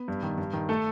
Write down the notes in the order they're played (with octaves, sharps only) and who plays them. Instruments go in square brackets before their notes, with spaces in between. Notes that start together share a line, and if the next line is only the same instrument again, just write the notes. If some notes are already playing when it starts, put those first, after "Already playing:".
Already playing: [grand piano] B3 B4
G2
D#3
G2
D#3
A3 A4